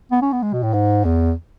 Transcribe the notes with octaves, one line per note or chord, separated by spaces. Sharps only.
B3
C#4
B3
G#3
B2
A2
G#2
E2